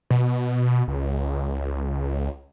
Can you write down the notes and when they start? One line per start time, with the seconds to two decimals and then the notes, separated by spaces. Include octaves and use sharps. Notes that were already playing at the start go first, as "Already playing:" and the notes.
0.10 B2
0.88 C#2